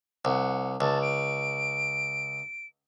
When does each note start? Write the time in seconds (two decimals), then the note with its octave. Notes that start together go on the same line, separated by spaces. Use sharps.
0.25 C2 F#5
0.81 C#2 A5
1.02 D7